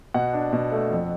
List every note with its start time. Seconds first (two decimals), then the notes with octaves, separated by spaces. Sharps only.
0.14 B2 F#5
0.33 D4
0.53 B2
0.72 A3
0.91 F2